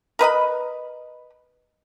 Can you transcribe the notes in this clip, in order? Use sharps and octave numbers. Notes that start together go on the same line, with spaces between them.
A#4 B4 D#5 B5